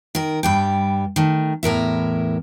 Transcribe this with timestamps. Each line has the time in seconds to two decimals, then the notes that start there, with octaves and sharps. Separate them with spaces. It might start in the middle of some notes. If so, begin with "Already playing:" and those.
0.15 D#3 A#4
0.43 G2 G3 G5
1.16 D#3 A3
1.63 E2 A2 A#4 E5